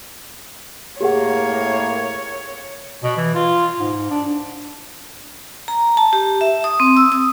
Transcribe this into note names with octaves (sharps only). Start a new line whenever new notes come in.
A2 A#3 G4 G#4 C#5 F#5
B2
E3
F4
G#2
D4
A#5
A5
G4
E5
D#6
C4
E6
D#6